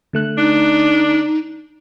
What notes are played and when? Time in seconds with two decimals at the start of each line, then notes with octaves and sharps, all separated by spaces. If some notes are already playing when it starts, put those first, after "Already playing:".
0.13 D3 A3 F#6
0.38 D4 D#4